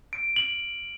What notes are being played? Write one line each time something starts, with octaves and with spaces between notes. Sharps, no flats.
D7
F#7